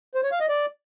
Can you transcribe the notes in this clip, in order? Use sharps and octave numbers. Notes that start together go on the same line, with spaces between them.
C5
C#5
F5
D#5
D5